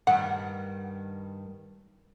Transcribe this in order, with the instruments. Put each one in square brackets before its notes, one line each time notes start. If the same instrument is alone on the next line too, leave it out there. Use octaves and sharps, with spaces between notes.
[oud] G2 D#3 [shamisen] F#5